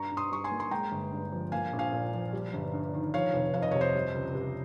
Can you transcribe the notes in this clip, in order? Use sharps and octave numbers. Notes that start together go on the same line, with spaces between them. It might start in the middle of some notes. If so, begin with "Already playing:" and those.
Already playing: G2 A#5 C#6
G2
C6 D#6
G3 C#6
G#5 C6
A#3
C6
G#3 G5 A#5
G1
G2
F3
A#3 F5 G#5
A#1
F5 G#5
A#2
F3
G3
G1
G2
D#3
F3 C#5 F5
F1
F2 F5
D#5
C3 C#5
C5 D#5
G3
C#2
C3